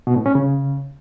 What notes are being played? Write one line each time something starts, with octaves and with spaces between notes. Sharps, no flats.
B2
A2
C#4
C#3